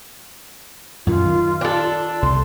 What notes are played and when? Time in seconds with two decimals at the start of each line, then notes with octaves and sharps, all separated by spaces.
1.07 F#2 A#2 D#3 F4
1.26 D#3
1.61 D4 A4
2.22 C2 C6